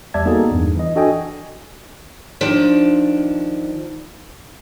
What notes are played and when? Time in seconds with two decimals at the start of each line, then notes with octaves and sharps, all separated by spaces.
0.14 E2 G3 D5 E5 A5 G#6
0.25 A#3 B3 D#4 F#4 G#4 A4
0.51 E2 G2
0.76 E3 D#5
0.95 D4 F#4 A4 D#5 G5 G#5
2.41 D#3 F3 D4